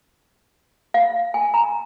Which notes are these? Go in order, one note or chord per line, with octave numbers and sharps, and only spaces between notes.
F5
G#5
A#5